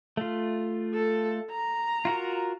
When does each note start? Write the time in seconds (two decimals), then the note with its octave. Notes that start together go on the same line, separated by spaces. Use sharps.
0.17 A3 F4
0.94 A4
1.51 A#5
2.05 F4 F#4 A#4